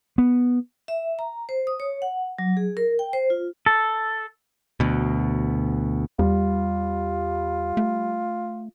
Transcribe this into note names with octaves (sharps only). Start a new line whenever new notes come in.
B3
E5
A#5
C5
D#6
C#5
F#5
F#3
G#4
A#4
G5
C5
F4
A4
D2 B2
E2 G3 F4
A3